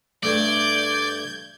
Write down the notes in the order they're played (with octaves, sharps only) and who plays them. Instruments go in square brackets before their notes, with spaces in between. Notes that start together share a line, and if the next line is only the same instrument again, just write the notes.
[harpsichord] G2 A3 [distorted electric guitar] D5 [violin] G6 G#6